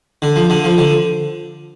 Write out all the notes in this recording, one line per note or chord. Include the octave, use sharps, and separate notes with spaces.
D3
F3
D3
F3
D3